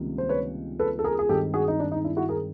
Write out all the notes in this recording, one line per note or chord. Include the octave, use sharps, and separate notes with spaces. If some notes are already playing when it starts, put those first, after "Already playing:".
Already playing: C#2 C3 D#3 G3 A#3
C5
B4 C#5
A4 B4
A4
G#4 A#4
G#4
G2 D#3 G#3 C4 G4 A4
F#4 G#4
D#4
D4
D#4
D4 E4
E4 F#4
G#4 A#4